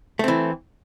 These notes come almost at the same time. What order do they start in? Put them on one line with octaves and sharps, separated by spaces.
A3 C4 E3